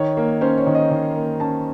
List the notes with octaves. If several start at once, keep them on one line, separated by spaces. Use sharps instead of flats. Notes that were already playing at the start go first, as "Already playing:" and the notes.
Already playing: D#3 C#5
A#3
C#4 C5
C#5
D#3
D#5
D#3
A#3
C#4 A5